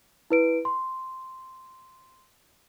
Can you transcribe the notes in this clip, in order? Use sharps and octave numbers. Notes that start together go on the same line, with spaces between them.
E4 B4 D7
C6